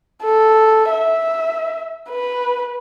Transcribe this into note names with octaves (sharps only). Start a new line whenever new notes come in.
A4
E5
B4